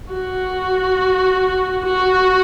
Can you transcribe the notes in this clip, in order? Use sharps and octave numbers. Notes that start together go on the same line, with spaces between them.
F#4
F#4